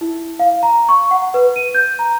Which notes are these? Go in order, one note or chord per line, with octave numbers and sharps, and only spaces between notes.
E4
F5
A#5
C#6
F#5
B4
D#7
G6
A#5